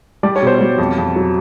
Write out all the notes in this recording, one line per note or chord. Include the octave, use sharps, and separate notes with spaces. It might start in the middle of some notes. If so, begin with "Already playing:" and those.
G3 D5
C#5
B2 C5
G3 C#5
F2
F2
F#3